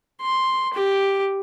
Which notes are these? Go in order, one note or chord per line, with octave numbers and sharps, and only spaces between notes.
C6
G4